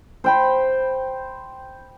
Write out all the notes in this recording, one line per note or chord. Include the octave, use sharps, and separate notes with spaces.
C5 G5 B5